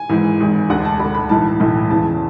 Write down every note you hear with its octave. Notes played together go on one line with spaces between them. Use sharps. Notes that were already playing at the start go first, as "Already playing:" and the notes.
Already playing: G#5
G#1 G#2 E3
G#1 G#2 E3
E1 D2 D3 F#5
A5
E1 D2 D3 B5
B5
B1 A2 E3 A5
B1 A2 E3
E2 C#3 E3 A5